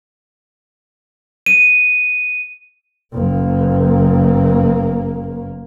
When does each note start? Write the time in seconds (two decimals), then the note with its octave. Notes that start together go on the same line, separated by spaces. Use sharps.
1.46 D#7
3.13 F#1 A#3